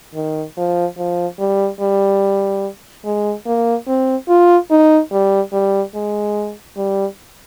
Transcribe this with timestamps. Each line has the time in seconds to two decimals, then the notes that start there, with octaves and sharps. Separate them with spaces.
0.15 D#3
0.57 F3
0.98 F3
1.39 G3
1.80 G3
3.05 G#3
3.46 A#3
3.87 C4
4.29 F4
4.71 D#4
5.12 G3
5.53 G3
5.95 G#3
6.77 G3